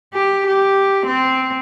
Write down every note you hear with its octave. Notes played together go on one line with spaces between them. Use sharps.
G4
G4
C4